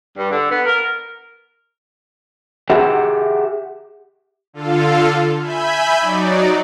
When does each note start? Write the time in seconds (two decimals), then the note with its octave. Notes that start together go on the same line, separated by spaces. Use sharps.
0.17 G2
0.31 D3
0.51 B3
0.66 A#4
2.70 G4 G#4 E5 F#5
4.53 D3 F4 A4 F5
5.40 E5 G#5 B5 G6
5.99 F#3 D#4 D5